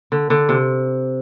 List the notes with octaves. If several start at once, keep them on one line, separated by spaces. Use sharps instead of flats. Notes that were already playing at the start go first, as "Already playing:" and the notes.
D3
D3
C3